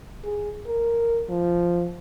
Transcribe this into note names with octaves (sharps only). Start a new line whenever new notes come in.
G#4
A#4
F3